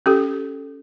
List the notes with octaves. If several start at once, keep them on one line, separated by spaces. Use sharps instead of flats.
C#4 G4 A4